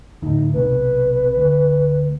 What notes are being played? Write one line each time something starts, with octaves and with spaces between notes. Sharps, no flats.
D2 A2 D#4
B1 C3 B4
D2